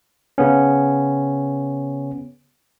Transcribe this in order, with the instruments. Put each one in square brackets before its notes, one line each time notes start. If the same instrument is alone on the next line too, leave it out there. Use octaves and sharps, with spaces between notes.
[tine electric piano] C#3 B3 C#4